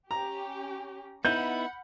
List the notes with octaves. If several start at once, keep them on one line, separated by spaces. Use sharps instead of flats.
C#4 G4 A#5
B3 D#4 E4 F#5 B5 G6